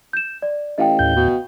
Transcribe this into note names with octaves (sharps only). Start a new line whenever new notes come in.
G6 E7
D5
A1 D#5 F5 G5
D#2 A2 G6
B2